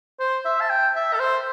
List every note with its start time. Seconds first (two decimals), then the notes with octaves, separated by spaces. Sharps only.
0.20 C5
0.45 E5
0.61 A5
0.70 G5
0.96 E5
1.14 A4
1.20 C5